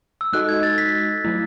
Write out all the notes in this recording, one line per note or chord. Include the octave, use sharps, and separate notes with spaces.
E6
G#3 D#4 F#4 A4 D#5 F#6
G#6
A6
B6
F#3 A3 E4